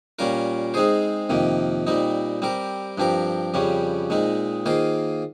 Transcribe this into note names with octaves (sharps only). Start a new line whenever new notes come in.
A#2 G3 C#4 F4 A#4
G#3 C4 D#4 G#4 C5
F2 C3 D#3 A#3
A#2 G3 C4 D#4
G3 C4 G4 A#4
G2 F3 C4 G4 A#4
F2 C#3 G3 C#4 G4
A#2 G#3 C4 D#4
D#3 A#3 F4 G#4 C5